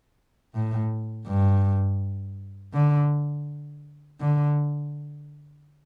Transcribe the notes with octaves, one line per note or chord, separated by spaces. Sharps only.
A2
G2
D3
D3